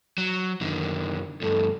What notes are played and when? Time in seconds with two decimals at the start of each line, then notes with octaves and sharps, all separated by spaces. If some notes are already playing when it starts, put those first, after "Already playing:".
0.18 F#3
0.61 F#2 D3 D#3
1.42 D2 G2 A4